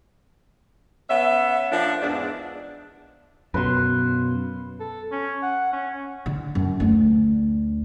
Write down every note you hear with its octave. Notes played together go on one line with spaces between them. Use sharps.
B3 C#4 E5
F3 A#3 D4
E2 G#2 D4
F#2 B2 B4 F5 C6
A4
C#4
F#5
C#4
D3
F#2
D2 D4